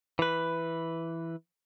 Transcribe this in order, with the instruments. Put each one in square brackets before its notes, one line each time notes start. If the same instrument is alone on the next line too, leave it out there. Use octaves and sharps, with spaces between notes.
[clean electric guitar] E3 B4